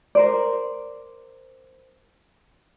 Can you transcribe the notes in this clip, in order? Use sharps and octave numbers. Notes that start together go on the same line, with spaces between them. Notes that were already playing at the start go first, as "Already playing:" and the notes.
A#4 C5 D5